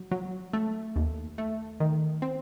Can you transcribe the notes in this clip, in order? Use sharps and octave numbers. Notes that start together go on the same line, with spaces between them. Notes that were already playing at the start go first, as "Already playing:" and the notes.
Already playing: F#3
F#3
A3
D#2
A3
D#3
C4